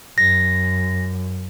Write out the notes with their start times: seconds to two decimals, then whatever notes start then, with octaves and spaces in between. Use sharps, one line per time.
0.18 F#2 A#6